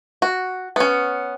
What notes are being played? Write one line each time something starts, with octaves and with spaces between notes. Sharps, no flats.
F#4
B3 C#4